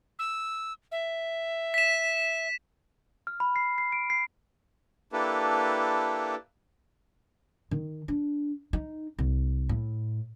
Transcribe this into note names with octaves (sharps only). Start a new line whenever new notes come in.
E6
E5
B6 E7
F6
B5
C7
C7
D7
C7
A#3 D4 E4 G4 A4 B4
D#3
D4
D#4
C2
A2